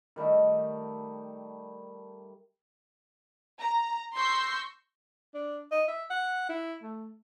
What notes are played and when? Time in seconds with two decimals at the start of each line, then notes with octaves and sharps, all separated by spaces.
0.16 D#3 G3 A3 D#5
3.59 A#5
4.15 C6 C#6 E6 G6 A#6 C7
5.34 D4
5.71 D#5
5.88 E5
6.10 F#5
6.49 E4
6.83 A3